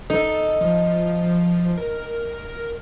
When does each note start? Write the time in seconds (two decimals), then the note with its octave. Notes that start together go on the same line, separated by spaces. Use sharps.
0.10 D#4 A4
0.61 F3
1.77 A#4